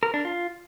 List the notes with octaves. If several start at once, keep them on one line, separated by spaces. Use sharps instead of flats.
A#4
D4
F4